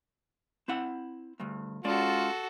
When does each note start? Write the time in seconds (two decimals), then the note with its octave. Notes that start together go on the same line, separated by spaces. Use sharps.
0.68 C4 E4 F#5
1.40 D2 G2
1.84 G#3 C#4 F4 F#4 A4 D5